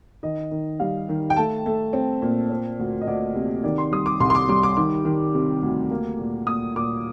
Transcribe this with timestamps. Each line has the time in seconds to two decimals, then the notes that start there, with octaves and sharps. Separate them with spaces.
0.23 D#3 D#5
0.51 D#3
0.80 G3 F5
1.09 D#3
1.30 G5
1.36 A3 A5
1.66 A3
1.93 C4
2.22 A#2
2.50 C4
2.79 D2
3.01 D#5
3.07 D2 D5
3.35 C3
3.64 D#3 D5
3.78 C6
3.92 G3 D#6
4.06 D6
4.20 C2 C6
4.30 C6
4.35 D6
4.48 G3 D6
4.63 D6
4.77 D#3 D6
5.05 D#3
5.34 C3
5.62 D2
5.91 A#3
6.19 A#2
6.47 A#2 D#6
6.75 A#2 D6